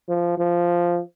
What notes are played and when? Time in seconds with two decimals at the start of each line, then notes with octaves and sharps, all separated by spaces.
0.09 F3
0.38 F3